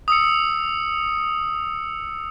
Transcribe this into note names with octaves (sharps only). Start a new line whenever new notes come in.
D#6 E6 C#7